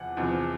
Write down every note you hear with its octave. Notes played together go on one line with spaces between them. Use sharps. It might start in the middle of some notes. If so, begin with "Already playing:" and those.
Already playing: E2 C3 F3 F#5
E2 C3 F3